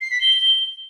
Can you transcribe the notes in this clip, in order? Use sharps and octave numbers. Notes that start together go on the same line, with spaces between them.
C7
B6
G7